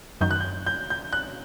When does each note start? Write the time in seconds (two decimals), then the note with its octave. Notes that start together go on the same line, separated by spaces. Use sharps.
0.21 F#2 D#3 F#3 G6
0.31 F#6
0.40 G6
0.66 G6
0.90 G6
1.13 F#6